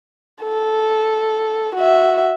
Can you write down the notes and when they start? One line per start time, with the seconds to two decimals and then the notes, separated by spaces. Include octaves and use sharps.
0.43 A4
1.76 F#4 E5